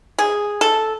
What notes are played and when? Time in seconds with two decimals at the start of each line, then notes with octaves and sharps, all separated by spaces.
0.19 G#4
0.61 A4